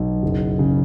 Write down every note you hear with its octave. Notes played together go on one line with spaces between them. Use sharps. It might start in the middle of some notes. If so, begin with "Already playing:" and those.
Already playing: B1
F#1
C#3